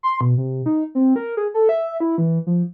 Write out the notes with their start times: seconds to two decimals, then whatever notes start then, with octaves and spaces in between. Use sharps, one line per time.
0.03 C6
0.21 B2
0.38 C3
0.66 D#4
0.95 C4
1.16 A#4
1.37 G#4
1.54 A4
1.69 E5
2.00 E4
2.18 E3
2.47 F3